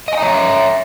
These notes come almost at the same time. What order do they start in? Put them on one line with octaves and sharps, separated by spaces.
D#5 G#5 A#5 C#5 E5